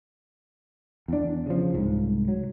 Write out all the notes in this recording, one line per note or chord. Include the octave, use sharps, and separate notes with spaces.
E2 D4
C#3 F3
C2 G#2
F#3